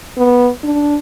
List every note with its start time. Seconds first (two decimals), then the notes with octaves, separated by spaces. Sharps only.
0.17 B3
0.64 D4